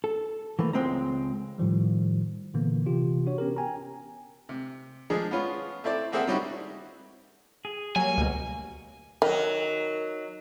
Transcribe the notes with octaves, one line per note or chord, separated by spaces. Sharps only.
A4
E3 A3 A#3
C#2 B2 G#3 C4 C5 A#5
A2 D#3 F3 G3
A#2 D3 E3 A#3 B3
C3 E3 F4 G4
D4 F#4 C#5
B3 C#4 G4 A#4
G5 G#5 A#5
C3
F3 G#3 D4 G#4
B3 C#4 F4
A3 C4 E4 D5
A3 A#3 C4 G#4 E5 F#5
G3 C#4 D#4 E4 F#4
G#4
F#3 G3 A#3 F#4 G#5
D2 B2
D#3 F#3 D#4 A#4